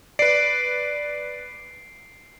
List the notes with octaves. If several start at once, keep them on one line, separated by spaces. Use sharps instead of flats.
B4 D5 C7 D7